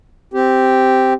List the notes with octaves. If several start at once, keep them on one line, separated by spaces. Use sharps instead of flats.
C4 G4